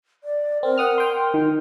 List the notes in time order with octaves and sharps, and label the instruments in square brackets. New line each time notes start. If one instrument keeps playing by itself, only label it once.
[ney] D5
[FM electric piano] C4 [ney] A#4
[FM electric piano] F#5 D#6 F6
G5 C6
D#3